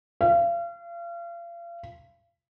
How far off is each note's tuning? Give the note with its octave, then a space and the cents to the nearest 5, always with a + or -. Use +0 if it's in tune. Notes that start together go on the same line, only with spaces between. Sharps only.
F5 -35